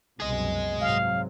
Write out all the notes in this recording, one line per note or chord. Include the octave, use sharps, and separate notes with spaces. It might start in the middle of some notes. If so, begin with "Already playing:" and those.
C2 F#2 B2 G#4 D#5
G#2 C3 F#3 F5